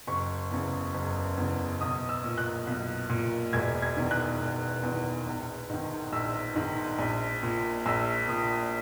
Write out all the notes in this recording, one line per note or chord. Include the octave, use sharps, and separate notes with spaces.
F#1 C#6
E2 C#3
F#1
E2 C#3
B1 D#6
E6
A#2
F#6
B1
A#2
E1 G#6
G#6
E2 D#3
F#6
E1
E2 D#3
A#1
G#2 D#3
A#1 E6
G#2 D#3
A#1
A#2
A#1 E6
A#2 D#6